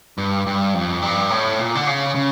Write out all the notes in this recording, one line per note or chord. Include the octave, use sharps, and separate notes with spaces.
G2
G2
F2
G2
A2
A#2
D3
C#3
C#3